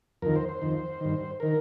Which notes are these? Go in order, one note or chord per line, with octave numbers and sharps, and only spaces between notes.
F2 D#3 A#4
C5
C5
F2 D#3
G2 D#3
D#3 A#4